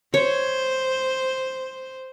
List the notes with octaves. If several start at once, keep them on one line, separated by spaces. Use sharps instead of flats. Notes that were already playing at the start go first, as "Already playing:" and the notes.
C5 C#5